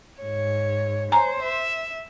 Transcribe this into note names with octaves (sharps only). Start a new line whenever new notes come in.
G#2 C#5
C5 C#5 G#5 A#5
E5